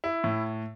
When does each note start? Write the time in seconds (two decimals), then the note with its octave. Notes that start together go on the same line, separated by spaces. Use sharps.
0.04 E4
0.24 A2